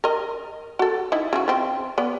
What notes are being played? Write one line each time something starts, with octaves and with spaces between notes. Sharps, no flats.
A#4 D#5
F#4 A4
D#4 E4
C#3 E3 F#4
F3 C4
B3 D5